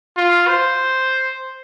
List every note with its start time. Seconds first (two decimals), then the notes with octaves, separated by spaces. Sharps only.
0.17 F4
0.48 C5